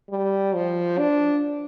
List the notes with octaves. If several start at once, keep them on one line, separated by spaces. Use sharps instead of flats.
G3
F3
D4